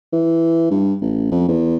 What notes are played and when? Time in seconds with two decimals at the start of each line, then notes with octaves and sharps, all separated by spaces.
0.13 E3
0.71 G2
1.01 A1
1.31 F2
1.48 E2